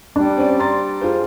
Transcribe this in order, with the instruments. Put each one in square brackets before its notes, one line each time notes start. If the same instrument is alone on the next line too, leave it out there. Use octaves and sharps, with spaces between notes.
[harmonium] G3 [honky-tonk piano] D4
[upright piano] C4 C#4 D5
A#5 C6 A6
F4 G#4 C5